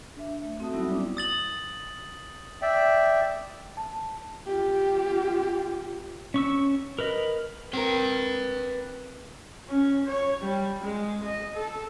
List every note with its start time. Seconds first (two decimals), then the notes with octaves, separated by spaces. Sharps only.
0.17 D4 E5
0.43 A3
0.60 C4 F#4 A4 E5 A5 D#6
0.73 F#3 G3 B3 D#4 E4 F#4
0.90 G3 C#4 E4 D5 D6
1.17 D#6 A6 F#7
2.62 D5 E5 G5
3.77 A5
4.46 F4 G4
6.34 C#4 C#6 E6
6.99 A#4 B4 D#5
7.73 C4 A#4 B4 G5
9.67 C#4
10.05 C#5
10.41 G3
10.81 G#3
11.23 D#5
11.54 A4